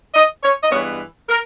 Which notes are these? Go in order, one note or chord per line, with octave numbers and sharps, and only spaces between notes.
D#5
C#5
D#5
G2 E3 G#3 B3 C#5
A#4